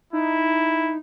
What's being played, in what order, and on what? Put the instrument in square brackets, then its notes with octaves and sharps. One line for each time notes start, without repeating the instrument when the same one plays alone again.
[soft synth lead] D#4 [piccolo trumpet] E4